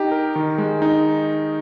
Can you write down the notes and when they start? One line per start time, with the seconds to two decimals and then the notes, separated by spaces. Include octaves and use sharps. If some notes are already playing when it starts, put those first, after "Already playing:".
Already playing: D#4 G4
0.11 A#4
0.36 D#3
0.58 G#3
0.82 D#4